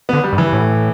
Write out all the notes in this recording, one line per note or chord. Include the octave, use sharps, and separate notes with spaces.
D3 B3
G3
G2
E3
A2